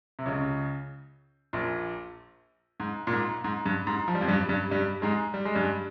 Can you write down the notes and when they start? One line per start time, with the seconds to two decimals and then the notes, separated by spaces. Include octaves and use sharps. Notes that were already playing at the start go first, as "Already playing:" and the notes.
0.19 C3
0.26 C#2 C#3
1.53 A#1 A#2
2.80 G#2
3.07 A#2
3.12 G#2
3.44 G#2
3.66 G2
3.87 G#2
4.08 F3
4.15 G3
4.21 F2 F3
4.28 G2 G3
4.49 G2 G3
4.71 G2 G3
5.02 G#2 G#3
5.34 G3
5.45 G#3
5.55 G2 G3